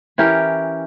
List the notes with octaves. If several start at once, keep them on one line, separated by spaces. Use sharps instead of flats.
E3 C#4 G4 A#4